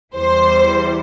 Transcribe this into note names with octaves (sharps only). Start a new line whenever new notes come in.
E2 E3 G3 C5